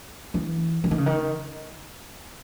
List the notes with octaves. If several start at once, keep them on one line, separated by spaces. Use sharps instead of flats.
E3
E3
D#3
C#3
D#3